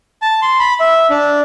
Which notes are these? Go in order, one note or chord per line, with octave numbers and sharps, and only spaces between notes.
A5
C6
B5
E5
D4